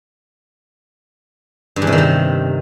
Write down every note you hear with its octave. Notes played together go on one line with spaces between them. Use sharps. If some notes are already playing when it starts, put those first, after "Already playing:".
G2
E2
C3
D#3
C3